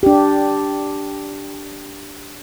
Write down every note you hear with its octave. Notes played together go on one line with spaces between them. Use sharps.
D4 G4